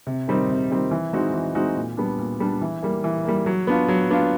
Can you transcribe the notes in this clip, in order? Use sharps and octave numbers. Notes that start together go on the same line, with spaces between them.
C3
D#3 G3 C4 D#4
C3
D#3 G3 C4 D#4
E3
G#3 C4 D#4 F#4
E3
G#3 C4 D#4 F#4
A#2
G3 B3 D4
A#2
G3 B3 D4
E3
G3 A#3
E3
G3 A#3
F#3
B3 D4 F4
F#3
B3 D4 F4